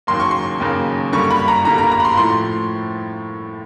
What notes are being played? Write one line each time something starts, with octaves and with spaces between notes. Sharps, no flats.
D#2 C#3 F#3 A#3 C6
C#6
C6
D#2 C#3 F#3 A#3
G2 D3 G3 A#3 C#6
B5
A#5
G2 D3 G3 A#3 A#5
A#5
A#5
B5
C6
A2 F3 A3 C6